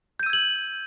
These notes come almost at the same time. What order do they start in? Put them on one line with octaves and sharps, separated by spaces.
G6 D#7 E6 G#6 F#7